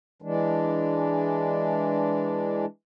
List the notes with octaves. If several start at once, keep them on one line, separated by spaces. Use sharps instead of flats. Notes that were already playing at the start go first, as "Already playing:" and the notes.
E3 G#3 D4